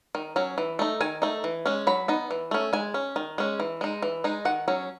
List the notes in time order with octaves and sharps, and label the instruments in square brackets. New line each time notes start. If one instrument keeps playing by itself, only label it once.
[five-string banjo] D#3
F#3 C#4
E3
A3 D#4
D#3 G#5
A3 D#4
E3
G#3 C#4
F#3 B5
B3 D#4
E3
A3 C#4
G#3 G#5
C#4
D#3
G#3 C#4
E3
G#3 D#4
E3
G#3 D#4
D#3 F#5
F#3 C#4